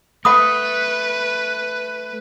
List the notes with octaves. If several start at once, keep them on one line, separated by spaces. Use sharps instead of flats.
A3 B4 F#5 B5 D#6